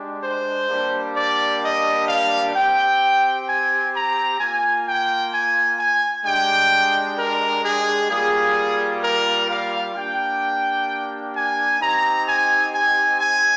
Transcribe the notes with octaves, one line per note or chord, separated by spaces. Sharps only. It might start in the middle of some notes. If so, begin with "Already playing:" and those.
Already playing: G#3 D4 G4
C5
G3 A#3 D4 G4
D5
D#5
F5
C4 G4 G5
G#5
A#5
A#3 F4 G#5
G5
G#5
G#5
G#3 D4 G4 G5
A#4
G#4
G3 A#3 F4 G#4
A#4
F5
A#3 D4 G4 G5
G#5
C4 D#4 G4 A#5
G#5
G#5
G#5